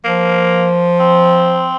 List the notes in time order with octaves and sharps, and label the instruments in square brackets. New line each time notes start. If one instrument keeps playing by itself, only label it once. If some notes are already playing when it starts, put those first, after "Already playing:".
[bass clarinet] F3 [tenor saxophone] A#3
[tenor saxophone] C4